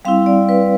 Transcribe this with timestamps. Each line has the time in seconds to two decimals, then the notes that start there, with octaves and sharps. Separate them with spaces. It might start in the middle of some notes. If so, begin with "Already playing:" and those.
0.05 G3 C4 E4 F5
0.26 D5
0.49 B4